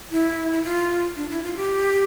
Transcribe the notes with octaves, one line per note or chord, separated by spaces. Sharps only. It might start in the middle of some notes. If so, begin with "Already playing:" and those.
E4
E4
F4
D4
E4
F4
G4